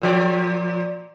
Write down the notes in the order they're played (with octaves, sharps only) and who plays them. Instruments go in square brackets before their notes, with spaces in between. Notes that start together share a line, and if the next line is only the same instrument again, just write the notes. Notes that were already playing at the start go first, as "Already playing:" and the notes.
[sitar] A#2 F3 D5